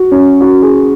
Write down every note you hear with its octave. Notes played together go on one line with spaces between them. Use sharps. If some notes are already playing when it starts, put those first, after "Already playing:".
Already playing: F#4
C#4
F#4
G#4